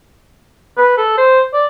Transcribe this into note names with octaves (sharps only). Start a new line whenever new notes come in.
B4
A4
C5
D5